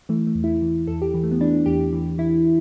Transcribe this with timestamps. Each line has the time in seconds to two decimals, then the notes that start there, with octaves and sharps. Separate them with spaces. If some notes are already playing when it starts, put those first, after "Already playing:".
0.09 E3 A3
0.27 A3
0.35 E2
0.44 E4
0.62 E3
0.87 E2 A4
1.02 G4
1.14 E3
1.24 A3
1.32 B3
1.41 E3 D4
1.66 E2 G4
1.93 E3
2.18 E3 E4